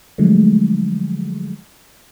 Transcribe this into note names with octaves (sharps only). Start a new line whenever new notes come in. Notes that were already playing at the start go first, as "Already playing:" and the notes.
D3 F3 F#3 G#3 A3